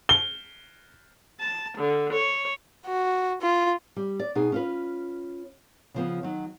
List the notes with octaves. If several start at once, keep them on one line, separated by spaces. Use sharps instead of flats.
G7
A5
D3
C#5
F#4
F4
G3
D5
B2 D#4 G#4
C#4 F4 B4
C#3 F3 B3
D#3 F#3